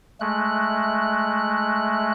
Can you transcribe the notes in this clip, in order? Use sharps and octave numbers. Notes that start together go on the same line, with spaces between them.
G#3 A3 F#6